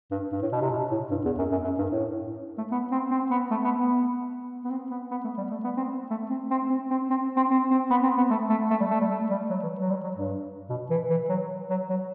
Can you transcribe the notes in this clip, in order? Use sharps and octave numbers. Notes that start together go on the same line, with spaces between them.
G2
G2
A2
B2
C3
B2
A2
G2
E2
F#2
F#2
F#2
G2
A2
A3
B3
C4
C4
B3
A3
B3
B3
B3
C4
B3
B3
A3
G3
A3
B3
C4
A3
C4
C4
C4
C4
C4
C4
C4
C4
B3
C4
B3
A3
A3
A3
G3
A3
G3
A3
G3
F#3
E3
F#3
G3
F#3
G2
B2
E3
E3
F#3
F#3
F#3